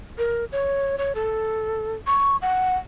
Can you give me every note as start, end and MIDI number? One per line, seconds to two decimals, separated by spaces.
0.18 0.45 70
0.52 0.96 73
0.98 1.13 73
1.15 1.95 69
2.07 2.37 85
2.42 2.76 78